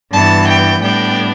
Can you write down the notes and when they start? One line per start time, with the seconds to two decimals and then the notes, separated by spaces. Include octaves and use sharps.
0.12 G2 E3 B3 A5
0.47 G5
0.81 A2 G3 B3 D4 G5